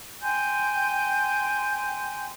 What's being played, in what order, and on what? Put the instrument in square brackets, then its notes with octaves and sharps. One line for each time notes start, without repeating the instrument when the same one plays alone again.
[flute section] G5 G#5 C6 G6